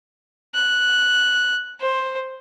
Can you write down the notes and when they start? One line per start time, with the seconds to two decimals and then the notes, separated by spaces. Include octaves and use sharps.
0.55 F#6
1.80 C5